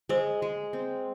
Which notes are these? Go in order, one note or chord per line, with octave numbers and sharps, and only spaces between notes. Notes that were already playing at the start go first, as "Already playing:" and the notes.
G#3 C5
G#3
C4